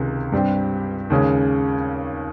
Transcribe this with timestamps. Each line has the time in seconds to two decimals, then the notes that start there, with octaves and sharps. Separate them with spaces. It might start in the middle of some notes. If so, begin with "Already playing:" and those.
Already playing: C#2 C3 D#3 G#3 C#4
0.32 G2 G3 C4 G4
1.10 D#2 C#3 G#3 C#4